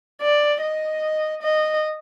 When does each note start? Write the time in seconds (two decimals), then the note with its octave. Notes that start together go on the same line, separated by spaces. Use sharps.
0.21 D5
0.62 D#5
1.42 D#5